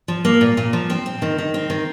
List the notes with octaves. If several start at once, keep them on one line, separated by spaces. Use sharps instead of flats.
F3
A#3
A#2
A#2
F3
C4
C4
D#3
D#3
C4
D#3